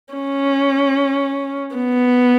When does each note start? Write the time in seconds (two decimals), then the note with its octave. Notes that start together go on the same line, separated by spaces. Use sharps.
0.14 C#4
1.76 B3